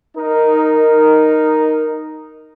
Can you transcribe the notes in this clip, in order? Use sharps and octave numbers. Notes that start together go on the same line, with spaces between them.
D#4 A#4